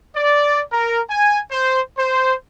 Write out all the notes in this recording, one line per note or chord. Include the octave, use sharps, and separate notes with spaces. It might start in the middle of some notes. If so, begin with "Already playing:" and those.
D5
A#4
G#5
C5
C5